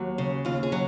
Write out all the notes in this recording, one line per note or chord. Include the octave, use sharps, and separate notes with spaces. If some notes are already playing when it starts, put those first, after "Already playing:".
Already playing: D#2 F#3
C#3
D#2 F4
G#4
F#3